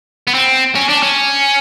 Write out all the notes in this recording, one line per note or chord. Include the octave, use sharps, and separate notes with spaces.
B3
C4
C#4
D4
C#4